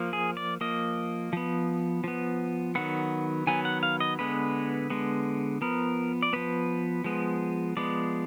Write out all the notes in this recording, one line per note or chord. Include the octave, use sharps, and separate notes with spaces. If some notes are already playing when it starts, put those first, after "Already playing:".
Already playing: F3 A#3
G#4
D5
F3 A#3 D#5
F3 B3
F3 B3
D#3 F#3 B3 F#5
D#3 F#3 B3 G#5
F#5
F5
D#5
D3 G#3 B3 B4
D3 G#3 B3
F3 B3 A#4
D5
F3 B3 B4
F3 G#3 B3
F3 G#3 B3 D5